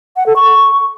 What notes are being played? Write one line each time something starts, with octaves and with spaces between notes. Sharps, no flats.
F#5
A4
C#6